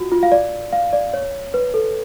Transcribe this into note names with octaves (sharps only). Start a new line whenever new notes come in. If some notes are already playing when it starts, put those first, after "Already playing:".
Already playing: F4 F#4
F4
F5
D5
F5
D5
C#5
B4
A4